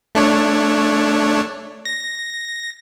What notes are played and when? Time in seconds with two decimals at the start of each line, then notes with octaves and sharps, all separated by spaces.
0.15 A3 D4 C#5
1.85 A#6